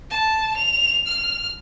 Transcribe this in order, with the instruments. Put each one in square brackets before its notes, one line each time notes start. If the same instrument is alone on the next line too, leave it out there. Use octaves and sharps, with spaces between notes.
[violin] A5
F7
F6